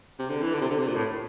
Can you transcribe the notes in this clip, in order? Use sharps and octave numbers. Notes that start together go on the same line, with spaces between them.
C3
D3
E3
D3
C3
D3
C3
A#2
A2